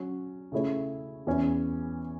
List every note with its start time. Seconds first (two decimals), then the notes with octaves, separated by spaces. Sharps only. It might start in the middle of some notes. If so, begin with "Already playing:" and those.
Already playing: F#3 C#4 F#4
0.52 C#3 A3 E4 C#5
1.27 E2 E3 C#4